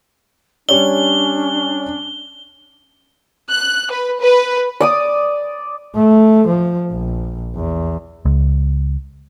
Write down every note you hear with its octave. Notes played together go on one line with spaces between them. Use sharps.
G3 C#4 D4 C#5 D5 G7
F#6
B4
B4
D5 D6 D#6
A3
F3
A#1
E2
C#2